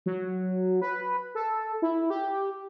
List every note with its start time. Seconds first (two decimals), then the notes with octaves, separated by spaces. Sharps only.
0.06 F#3
0.82 B4
1.35 A4
1.82 E4
2.10 G4